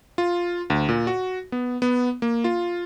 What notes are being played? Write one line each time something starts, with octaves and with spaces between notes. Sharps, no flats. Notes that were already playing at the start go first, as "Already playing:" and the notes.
F4
D2
A#2
F#4
B3
B3
A#3
F4